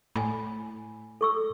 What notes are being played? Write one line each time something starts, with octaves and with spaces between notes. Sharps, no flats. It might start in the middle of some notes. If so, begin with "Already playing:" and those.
A2 G#5 B5
A4 C#6 E6